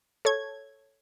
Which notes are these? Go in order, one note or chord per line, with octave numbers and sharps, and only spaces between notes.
A4 C#5 G#6